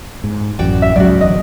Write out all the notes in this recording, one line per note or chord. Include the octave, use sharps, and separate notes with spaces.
G#2
A1 F#2 F#4 D5 G5
E5
C#2 G#2 C#3 F#3 F#4 D5
G1 E2 D#5